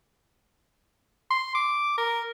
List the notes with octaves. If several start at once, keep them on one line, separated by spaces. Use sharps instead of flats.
C6
D6
A#4